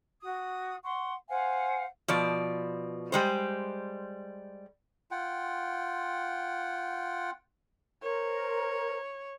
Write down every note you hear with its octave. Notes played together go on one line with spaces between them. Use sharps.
F#4 D#6
F#5 C6 C#6
C5 F5 F#5 G#5
B2 F3 D5
G3 G#3 C5
F4 F#5 G5
A#4 C5 C#5